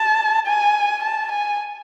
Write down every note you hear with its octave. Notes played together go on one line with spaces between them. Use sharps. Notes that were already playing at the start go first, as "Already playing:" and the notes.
Already playing: A5
G#5
A5
G#5